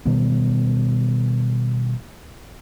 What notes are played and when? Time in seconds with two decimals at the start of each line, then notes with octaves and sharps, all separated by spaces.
0.05 B2 D#3 G3 B3